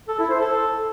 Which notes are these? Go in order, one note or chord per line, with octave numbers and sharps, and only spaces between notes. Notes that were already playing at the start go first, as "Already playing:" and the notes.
A4
E4
C5
A4